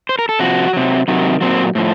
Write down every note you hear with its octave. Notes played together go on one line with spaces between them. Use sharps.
C5
A#4
A4
C3 F3 F#4
C3 F#3
C3 D#3 F#3
A#2 F#3 C4
A2 F3